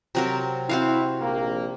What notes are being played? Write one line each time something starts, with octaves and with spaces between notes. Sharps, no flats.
C3 F#3 A#4
C4 E4 F#4 F5
A#1 A#3